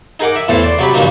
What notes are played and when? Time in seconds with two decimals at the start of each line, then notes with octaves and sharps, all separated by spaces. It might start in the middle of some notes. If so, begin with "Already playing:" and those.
0.20 D#4 G#4 A#4 F#5 D6
0.36 E5
0.48 E2 A2 E3 A4 C5 A5
0.61 D5 C6
0.78 C3 F#3 G4 B5
0.94 G2 A#2 C#3 F3 A#3 D#4